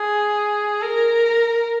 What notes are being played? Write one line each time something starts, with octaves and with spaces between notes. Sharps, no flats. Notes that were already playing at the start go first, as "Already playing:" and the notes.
Already playing: G#4
A#4